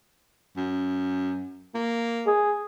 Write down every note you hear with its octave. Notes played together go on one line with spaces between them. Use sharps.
F#2
A#3
G#4